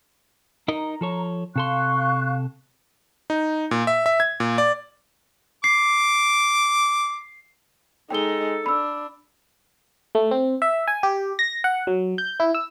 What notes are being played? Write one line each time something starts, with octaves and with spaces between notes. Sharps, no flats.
D#4 A#4 D#5 A#5
F3 A4 C#5
C3 A4 F5 C6 C#6 F#6
D#4
A#2
E5
E5
G#6
A#2
D5
D6 C7
G#3 D#4 A4 G5 G7
D4 B5 E6
A3
C4
E5
G#5
G4
A#6
F#5
F#3
G6
E4
E6